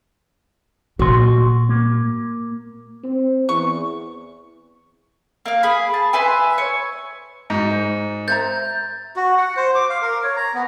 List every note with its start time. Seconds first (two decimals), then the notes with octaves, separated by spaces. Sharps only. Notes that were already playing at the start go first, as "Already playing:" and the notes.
0.99 A#2 F#4 C6
1.69 A#3
3.03 C4
3.49 E2 C#6
5.46 A#3 F5
5.63 G#4 B5
5.94 A5
6.13 B4 E5 G#5 C6
6.58 C#5
7.50 G#2 F#4 A#5
7.70 C5
8.28 C5 E5 A#5 G6 A6
9.16 F#4
9.37 F#5
9.56 C5
9.75 D6
9.89 F5
10.02 A#4
10.23 C#5
10.36 A#5
10.54 B3